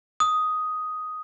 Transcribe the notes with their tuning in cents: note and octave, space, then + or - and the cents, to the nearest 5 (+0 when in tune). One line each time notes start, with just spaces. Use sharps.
D#6 +5